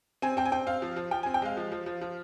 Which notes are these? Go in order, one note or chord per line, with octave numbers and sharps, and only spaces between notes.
C4 G#5
C4 G5
G#5
C4 G5
C4 F5
F3
F3
F3 G5
G#5
C4
G5
G#3 F5
F3
F3
F3
F3